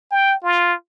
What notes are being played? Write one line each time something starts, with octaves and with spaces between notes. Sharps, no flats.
G5
F4